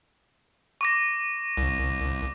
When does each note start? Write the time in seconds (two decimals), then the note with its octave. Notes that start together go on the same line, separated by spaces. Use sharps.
0.81 C#6 D6 A#6
1.57 C2